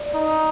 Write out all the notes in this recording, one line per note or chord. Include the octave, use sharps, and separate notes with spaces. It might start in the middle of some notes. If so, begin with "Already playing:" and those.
Already playing: D5
D#4